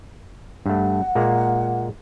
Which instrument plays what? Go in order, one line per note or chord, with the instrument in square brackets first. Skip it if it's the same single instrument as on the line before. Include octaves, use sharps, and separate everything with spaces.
[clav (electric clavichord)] G2 A3 [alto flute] F#5
[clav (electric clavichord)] A#2 G#3 A#3